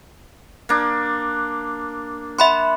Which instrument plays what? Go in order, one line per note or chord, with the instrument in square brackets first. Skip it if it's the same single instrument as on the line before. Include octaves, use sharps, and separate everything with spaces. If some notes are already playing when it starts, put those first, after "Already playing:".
[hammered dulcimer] A#3 D4
[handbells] E5 B5 C6 [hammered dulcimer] F#5